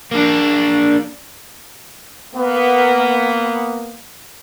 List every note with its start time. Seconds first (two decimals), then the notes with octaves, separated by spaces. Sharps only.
0.11 A#3 D4
2.34 A#3 B3